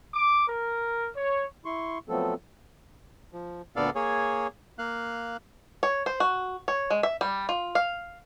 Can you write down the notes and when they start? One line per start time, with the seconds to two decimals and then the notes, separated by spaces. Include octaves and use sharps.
0.15 D6
0.48 A#4
1.15 C#5
1.65 E4 C6 C#6
2.09 F3 F#3 A3 B3 C4 A4
3.33 F3
3.76 D2 A#2 B3 A4 D5 F5
3.95 A#3 G#4 C#5
4.79 A#3 F5 F#6
5.83 C#5
6.06 C5
6.20 F#4
6.68 C#5
6.90 G#3
7.03 E5
7.21 G3
7.49 F4
7.75 F5